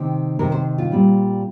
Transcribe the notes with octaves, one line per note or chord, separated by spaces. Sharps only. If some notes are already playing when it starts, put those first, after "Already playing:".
Already playing: C3 D#3 C4
C3 D#3 C4 A#4
C5
F4
A#2 G3 C4